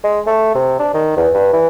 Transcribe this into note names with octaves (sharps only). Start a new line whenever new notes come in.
G#3
A3
C3
D4
D#3
E2
G2
E3